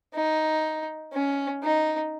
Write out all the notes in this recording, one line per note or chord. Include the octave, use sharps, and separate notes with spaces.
D#4
C#4
D#4